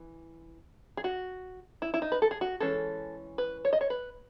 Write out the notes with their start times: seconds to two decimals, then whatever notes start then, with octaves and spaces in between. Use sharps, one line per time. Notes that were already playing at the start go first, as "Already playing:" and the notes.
Already playing: E3
0.97 G#4
1.04 F#4
1.82 E4
1.94 E4
2.02 D#4
2.12 B4
2.22 A4
2.31 G#4
2.41 F#4
2.60 E3 G#3 C#4 A4
3.38 B4
3.65 C#5
3.73 D#5
3.81 C#5
3.90 B4